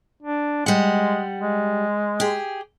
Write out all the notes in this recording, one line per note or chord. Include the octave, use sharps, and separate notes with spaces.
D4
G3 G#3 F#5
G#3
G4 G#4